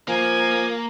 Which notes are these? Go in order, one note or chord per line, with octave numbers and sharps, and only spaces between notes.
F3 A#3 G#5